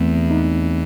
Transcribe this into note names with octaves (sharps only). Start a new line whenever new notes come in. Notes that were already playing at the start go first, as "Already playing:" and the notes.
Already playing: E2 E3 A3 C4
D#4